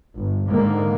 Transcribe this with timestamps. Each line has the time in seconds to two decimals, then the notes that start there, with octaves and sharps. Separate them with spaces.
0.16 G1
0.48 G#2 D3 D#3 A#3